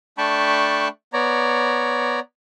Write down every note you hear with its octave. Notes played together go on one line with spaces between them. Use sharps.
A3 D4 G5 A5 B5 C#6
B3 C#5 D5 A#5